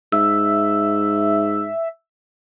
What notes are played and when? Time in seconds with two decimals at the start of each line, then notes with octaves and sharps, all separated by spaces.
0.12 G#2 E5 E6